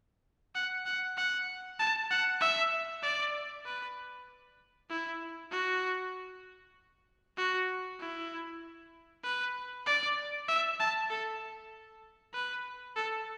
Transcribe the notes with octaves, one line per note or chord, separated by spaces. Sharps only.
F#5
F#5
F#5
A5
F#5
E5
D5
B4
E4
F#4
F#4
E4
B4
D5
E5
A5
A4
B4
A4